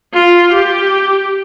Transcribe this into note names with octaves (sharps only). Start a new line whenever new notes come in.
F4
G4